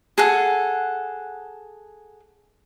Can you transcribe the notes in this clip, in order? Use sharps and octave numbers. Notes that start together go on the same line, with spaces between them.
G#4 A4 F#5